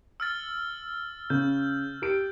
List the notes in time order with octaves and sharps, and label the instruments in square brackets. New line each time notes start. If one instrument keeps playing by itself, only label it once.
[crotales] E6 F6 A6
[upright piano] C#3 [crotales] G6
[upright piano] G4 D7